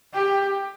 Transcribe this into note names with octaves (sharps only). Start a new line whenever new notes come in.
G4